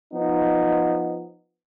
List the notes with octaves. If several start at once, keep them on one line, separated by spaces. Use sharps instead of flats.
F3 B3 D#4